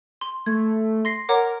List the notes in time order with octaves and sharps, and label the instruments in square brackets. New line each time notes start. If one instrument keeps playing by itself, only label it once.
[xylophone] C6
[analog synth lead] A3 [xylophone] G#6
[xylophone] C6 A#6 C7
[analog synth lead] A#4 [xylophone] C#5 F#5 D6